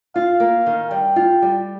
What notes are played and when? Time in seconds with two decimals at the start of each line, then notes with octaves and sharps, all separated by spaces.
0.15 F4 F5
0.40 A#3
0.66 D#3
0.91 G3 G5
1.16 F4
1.42 G3